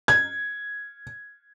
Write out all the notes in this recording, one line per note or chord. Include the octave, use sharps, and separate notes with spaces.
G#6